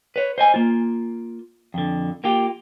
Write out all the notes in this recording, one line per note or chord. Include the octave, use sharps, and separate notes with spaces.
B4 C#5
C5 D#5 G#5
A#3 F4
F2 D3
A#3 F4 G4